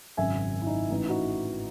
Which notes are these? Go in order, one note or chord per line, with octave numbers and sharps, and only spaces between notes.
G#1 F#2 C#3 E5 G#5
E4
D#4
A1 A2 E3 D#4
E4
D#4 F#4